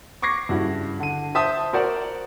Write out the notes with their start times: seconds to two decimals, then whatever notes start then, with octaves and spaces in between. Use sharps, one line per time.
0.22 C#6 D6 G#6 A#6 C7
0.49 G2 C#3 E4 F#4
1.00 D3 D#7
1.35 C5 E5 A5 C6 D#6 G6
1.73 F#4 A#4 C5 D5 F#5